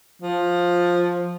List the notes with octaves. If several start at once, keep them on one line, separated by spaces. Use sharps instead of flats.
F3